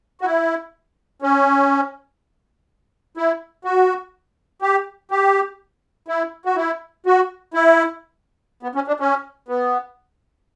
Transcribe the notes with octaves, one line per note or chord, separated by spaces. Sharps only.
F#4
E4
C#4
E4
F#4
G4
G4
E4
F#4
E4
F#4
E4
B3
C#4
D4
C#4
B3